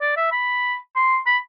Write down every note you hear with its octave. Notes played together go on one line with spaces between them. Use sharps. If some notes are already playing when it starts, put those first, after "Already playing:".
D5
E5
B5
C6
B5